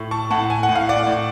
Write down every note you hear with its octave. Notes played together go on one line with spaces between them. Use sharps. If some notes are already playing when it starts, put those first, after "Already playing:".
Already playing: A2
A5 C#6
A2 F#5 A5
G#5
F#5
A2
F5
D5 F#5
A2